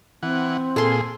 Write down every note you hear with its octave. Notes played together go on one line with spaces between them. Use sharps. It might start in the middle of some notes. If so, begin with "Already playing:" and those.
E3 C4 F#5
A#2 G#4 A4 C6